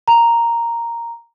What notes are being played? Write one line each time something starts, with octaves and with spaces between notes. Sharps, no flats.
A#5